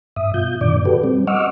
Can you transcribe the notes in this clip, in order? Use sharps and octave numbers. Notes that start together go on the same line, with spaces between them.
G2 E5 D#6
B2 F4 G6
F#2 A#2 D3 D#3 D5 D6
F#4 G4 A4 B4
G3 C4
D#5 F#5 C#6 D6 E6 F6